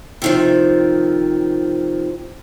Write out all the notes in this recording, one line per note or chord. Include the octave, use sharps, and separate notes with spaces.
C3 D#3 F3